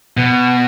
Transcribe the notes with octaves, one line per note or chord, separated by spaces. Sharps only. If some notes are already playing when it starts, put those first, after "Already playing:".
B2